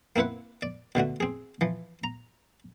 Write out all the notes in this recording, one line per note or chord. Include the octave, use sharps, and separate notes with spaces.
A#3 C4 E4 B4 F#5
D5
B2 D3 A3 F#4
C4 G#4
E3 F3
A#5